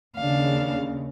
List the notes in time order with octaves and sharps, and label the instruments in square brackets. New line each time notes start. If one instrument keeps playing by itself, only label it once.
[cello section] D#2 C#3 [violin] D4 F5